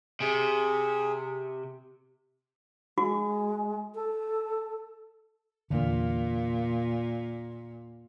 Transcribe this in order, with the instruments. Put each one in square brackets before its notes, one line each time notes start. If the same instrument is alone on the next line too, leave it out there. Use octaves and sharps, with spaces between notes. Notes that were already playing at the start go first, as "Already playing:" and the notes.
[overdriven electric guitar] C3 [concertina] G#4
[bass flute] G#3 [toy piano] F#4
[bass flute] A4
[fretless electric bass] E2 D3 [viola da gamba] A#2